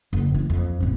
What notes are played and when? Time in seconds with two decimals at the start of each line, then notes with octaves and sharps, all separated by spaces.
0.13 F#1
0.34 E3
0.50 F2
0.80 A1 C4